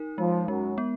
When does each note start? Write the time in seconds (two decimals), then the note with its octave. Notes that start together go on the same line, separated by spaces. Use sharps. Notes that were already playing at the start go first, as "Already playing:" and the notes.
Already playing: D#4 A#4
0.18 F3 G#3
0.48 F#2 F#3 G#3
0.78 B3